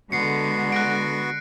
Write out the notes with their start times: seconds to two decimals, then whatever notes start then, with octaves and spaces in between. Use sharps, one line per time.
0.12 D3 G#3 B3 F#4 C7 C#7
0.72 F#6 A#6 D7